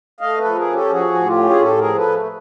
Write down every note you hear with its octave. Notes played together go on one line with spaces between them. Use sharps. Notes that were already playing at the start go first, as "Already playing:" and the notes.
A3 D#5 F5
A4 B4
F3
G#4 A#4
C#4
G4 A4
F3 F#4 G#4
A2
F4 G4
C#4
G#4
A2 G4 A4
G#4 A#4
F3
A4 B4
A3